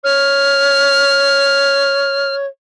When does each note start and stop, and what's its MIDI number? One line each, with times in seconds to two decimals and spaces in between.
0.04 2.47 73
0.04 2.34 89